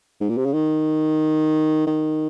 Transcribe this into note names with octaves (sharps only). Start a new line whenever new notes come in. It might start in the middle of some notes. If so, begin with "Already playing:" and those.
G#2
A#2
C3
C#3
D#3
D#3